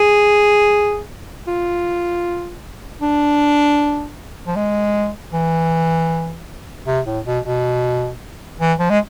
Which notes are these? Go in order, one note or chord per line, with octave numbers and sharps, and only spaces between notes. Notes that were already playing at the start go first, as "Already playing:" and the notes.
Already playing: G#4
F4
D4
F3
G#3
E3
C3
A2
B2
B2
E3
F3
G#3